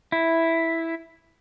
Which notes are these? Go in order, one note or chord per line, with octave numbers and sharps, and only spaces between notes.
E4